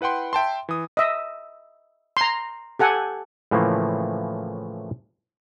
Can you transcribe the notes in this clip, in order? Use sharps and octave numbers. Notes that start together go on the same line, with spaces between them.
E4 B4 F#5 G5 C6
E5 G5 A5 C6
E3 D#6
D#5 E5
A#5 C6
G4 A4 F#5 G#5
A2 C#3 E3 F3 A3 A#3